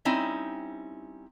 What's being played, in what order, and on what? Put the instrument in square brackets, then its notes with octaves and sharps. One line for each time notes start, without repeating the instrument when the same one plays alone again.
[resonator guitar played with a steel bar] G3 C4 C#4 D#4 E4